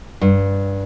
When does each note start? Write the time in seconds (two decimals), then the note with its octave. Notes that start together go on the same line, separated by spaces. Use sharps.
0.21 G2